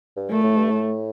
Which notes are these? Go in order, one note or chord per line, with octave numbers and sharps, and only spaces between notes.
G2
A#2 A3
A2
G2
A2